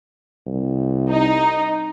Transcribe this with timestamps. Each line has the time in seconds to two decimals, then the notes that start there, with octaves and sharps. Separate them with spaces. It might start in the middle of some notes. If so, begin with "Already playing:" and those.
0.47 C2
1.10 D#4